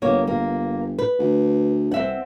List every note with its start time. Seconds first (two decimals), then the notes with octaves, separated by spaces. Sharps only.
0.02 G1 A#3 B3 C#5
0.27 G1 A#3
0.99 B4
1.19 D2
1.91 C2 C4 E5 F#5